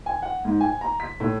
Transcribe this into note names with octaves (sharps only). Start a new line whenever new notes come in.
G#5
F#5
G#2
G#5
A#5
B6
A2